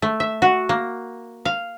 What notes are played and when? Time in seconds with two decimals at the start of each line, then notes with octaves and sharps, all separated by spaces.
0.02 A3
0.20 E5
0.42 F#4
0.69 A#3
1.45 F5